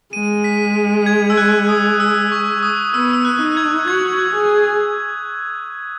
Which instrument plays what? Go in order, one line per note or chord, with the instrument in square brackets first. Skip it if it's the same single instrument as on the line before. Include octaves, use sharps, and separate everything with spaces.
[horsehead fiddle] G#3 [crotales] D#7
[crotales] B6
G#6
E6
F#6
D#6
E6
C#6
D#6
[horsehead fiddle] B3 [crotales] E6
[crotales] E6
F#6
[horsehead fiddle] D#4
[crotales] G#6
[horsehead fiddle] F#4 [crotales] G#6
[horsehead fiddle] G#4